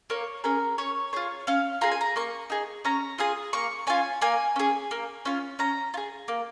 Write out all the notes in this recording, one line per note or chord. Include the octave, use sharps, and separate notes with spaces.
A#3 C#5
C#4 G#4 A#4
C#4 C#5
F4 G#4 C#5
C#4 F5
F4 G#4 A#5
G#5
A#5
A#3 C#6
D#4 G#4
C#4 A#5
F4 G#4 D#6
A#3 C#6
C#4 F4 G#5
A#3 G#5
C#4 G#4
A#3
C#4 F4
C#4 A#5
F4
G#4
A#3